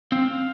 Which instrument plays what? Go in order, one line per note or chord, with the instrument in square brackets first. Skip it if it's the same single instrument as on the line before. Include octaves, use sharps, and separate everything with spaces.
[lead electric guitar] C4 [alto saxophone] F5